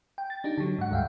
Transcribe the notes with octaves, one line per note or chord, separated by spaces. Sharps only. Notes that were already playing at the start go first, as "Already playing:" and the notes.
G5
A6
D4 D#4 G4
D3 F#3
G#2 F#5
D2 G2 E5 F5 G5